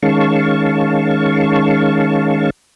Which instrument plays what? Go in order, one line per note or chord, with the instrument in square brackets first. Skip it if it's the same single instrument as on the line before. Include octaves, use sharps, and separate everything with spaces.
[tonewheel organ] D#3 G#3 C#4 F5 A5 C#6